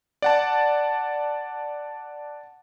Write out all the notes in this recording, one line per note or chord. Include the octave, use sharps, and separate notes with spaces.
D5 F#5 A5